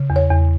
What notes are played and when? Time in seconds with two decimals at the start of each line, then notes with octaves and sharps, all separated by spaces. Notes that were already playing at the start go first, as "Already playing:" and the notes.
Already playing: C#3
0.10 E2
0.16 C#5
0.30 E2